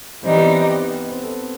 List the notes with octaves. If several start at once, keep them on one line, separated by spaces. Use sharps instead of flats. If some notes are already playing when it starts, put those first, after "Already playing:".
E3 G3 C4 D#4
B3
C4
A4